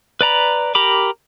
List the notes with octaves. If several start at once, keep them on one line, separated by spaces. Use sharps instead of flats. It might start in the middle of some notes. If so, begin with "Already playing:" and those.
B4 D5 A#5 B5
G4 A#4 A#5 B5 D6